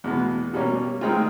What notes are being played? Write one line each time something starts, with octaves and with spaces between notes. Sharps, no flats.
E2 B2 G#3 B3
B2 G3 A#3 C#4
D#3 G#3 C4 F4